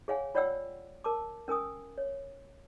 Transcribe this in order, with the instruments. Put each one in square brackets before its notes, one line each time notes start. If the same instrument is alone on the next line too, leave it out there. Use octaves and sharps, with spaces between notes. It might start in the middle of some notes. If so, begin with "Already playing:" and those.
[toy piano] G#4 C#5 F5 F#5 G#5
F4 C#5 D5 F#5 G5 E6
A#4 A5 D6
C#4 A#4 G#5 D#6
C#5